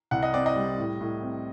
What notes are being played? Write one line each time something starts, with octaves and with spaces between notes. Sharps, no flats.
C2 F#5
D#5
C4 D5
D#5
G3
A2
A2
C4